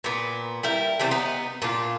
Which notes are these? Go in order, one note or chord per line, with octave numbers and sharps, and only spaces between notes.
A#2 B3
G3 E4 A#4
C3 E3 G3 C4
B3 D#4
A#2 D4 F4